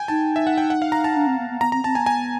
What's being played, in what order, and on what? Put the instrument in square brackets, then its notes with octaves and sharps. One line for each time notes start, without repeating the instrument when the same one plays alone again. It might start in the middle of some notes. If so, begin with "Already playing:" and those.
Already playing: [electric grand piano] G5 G#5
[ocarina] D#4 [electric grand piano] A5
[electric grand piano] E5
F#5
G5
F#5
F5
A#5
A5
[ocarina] D4
C4
B3
B3
[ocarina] B3 [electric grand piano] A#5
[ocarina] C4 [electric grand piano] A#5
[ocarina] C4 [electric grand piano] A5
[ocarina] B3 [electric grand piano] G#5
[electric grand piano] G#5